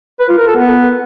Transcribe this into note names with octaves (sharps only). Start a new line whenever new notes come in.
B4
F4
A#4
A4
B3